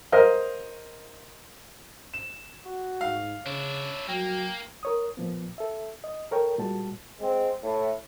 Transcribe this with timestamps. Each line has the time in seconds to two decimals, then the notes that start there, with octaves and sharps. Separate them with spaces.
0.12 A#4 C5 D#5 F5 D#6 F6
2.14 E7
2.66 F#4
3.01 G#2 F5
3.46 C#3 D4 E4 C#5
4.09 F#3 A#3 G5
4.83 A#4 C#5 D#6
5.17 A#2 F3 B3
5.58 A4 E5
6.04 D#5
6.31 A4 A#4 C#5 G5
6.59 A#2 G3 G#3 F#4 A5
7.21 G#3 C4
7.63 A2